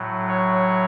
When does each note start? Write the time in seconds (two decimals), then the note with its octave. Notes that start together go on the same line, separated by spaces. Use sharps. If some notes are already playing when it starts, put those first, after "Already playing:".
Already playing: A2 F#3
0.28 C#5